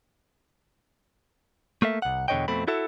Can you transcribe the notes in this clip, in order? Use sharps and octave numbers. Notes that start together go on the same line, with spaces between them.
A3 A#3 A4 E5
C2 F#5
E2 B2 D3 C#5 D#5 G5
F2 B2 A3 C4 B5
E4 F#4 A4 E5